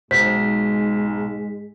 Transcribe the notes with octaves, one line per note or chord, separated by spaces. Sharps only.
B1 G#2 G#3 C5 B6